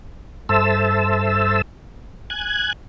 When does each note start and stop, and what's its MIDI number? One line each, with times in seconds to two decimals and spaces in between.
0.49 1.62 43
0.49 1.62 69
0.49 1.62 72
0.49 1.62 76
0.49 1.62 81
0.49 1.62 88
2.30 2.73 80
2.30 2.73 90
2.30 2.73 92